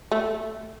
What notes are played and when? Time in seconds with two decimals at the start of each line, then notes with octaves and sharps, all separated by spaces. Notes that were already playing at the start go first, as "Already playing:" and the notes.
0.12 A3